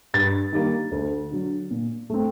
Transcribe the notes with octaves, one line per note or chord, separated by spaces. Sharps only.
G2 A6
D#3 G3 A#3
D2
D3 F#3
A#2
A3 C4